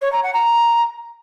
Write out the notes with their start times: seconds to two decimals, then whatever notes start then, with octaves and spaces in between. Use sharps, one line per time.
0.02 C#5
0.12 A#5
0.23 F#5
0.34 A#5